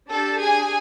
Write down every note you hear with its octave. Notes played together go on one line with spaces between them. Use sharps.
D4 G4 A4 A5
G#4 G#5